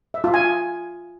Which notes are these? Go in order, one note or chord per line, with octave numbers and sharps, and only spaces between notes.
E5
F4
G#5